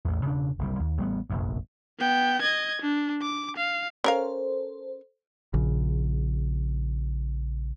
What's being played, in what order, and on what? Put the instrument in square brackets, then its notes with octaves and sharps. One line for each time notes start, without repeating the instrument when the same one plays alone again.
[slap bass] A1 E2
E1 C#3 D4
F#1 C2 G3
D#2
A1 G3 A3 B3
F1 A#1 F#2
[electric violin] B3 G5
D#5 G#6
D4
D6
F5
[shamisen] C#4 A#4 F5 [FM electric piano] A4 C5
[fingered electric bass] A#1 C#3